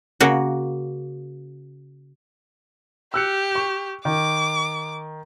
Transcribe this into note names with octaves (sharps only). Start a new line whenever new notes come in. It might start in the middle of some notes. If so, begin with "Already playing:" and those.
C#3 A#3 F#4
G4 E6 F#6 C#7
C#6
D#3 D6